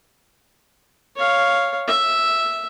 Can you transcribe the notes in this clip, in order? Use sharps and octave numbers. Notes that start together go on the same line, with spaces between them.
C#5 F5
E5